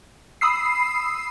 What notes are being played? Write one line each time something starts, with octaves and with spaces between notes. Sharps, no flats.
B5 D#6 E6 C7